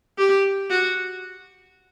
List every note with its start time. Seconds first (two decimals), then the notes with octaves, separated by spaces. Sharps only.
0.18 G4
0.70 F#4